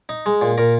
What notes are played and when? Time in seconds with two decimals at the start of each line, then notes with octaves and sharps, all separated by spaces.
0.09 D#4
0.26 G#3
0.42 A#2
0.58 A#2 A#4